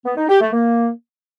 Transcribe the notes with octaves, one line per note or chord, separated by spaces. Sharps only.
B3
D#4
G4
A3
A#3